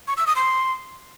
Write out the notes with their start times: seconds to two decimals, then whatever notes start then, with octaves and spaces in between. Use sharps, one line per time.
0.08 C#6
0.17 E6
0.27 D#6
0.36 C6